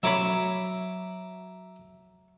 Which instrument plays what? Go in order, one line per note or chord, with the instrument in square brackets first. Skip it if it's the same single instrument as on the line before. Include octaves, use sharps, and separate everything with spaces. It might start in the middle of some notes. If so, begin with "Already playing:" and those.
[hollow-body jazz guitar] F#3 C#5 B5 [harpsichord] E5 A#5 D6